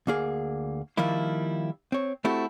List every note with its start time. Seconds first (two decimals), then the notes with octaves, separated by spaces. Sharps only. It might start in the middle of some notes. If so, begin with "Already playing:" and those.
0.07 D2 A#3 G#4
0.97 D#3 F3 G3 A#3 E4
1.92 C4 C#5
2.24 A3 C4 E4 F#4 G4 A4